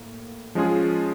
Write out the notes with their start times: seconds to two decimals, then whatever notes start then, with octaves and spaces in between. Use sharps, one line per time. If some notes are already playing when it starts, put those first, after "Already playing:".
Already playing: A2 A#3
0.55 F3 G#3 C#4 F4 G#4